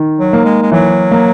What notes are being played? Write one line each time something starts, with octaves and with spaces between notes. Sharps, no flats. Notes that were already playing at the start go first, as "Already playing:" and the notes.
Already playing: D#3
F#3
A#3
G#3
G#3
E3 F#3
A#3